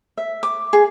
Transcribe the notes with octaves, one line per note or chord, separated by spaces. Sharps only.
E5
D6
G#4